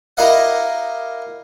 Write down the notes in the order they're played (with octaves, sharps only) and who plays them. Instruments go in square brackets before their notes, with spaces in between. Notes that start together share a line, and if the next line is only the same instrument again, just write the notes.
[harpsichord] E4 G4 A#4 D#5 F5 F#5